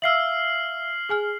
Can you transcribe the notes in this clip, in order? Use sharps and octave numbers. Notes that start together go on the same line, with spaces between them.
E5 F5 E6 F6 C7 F#7
G#4 G#5 F6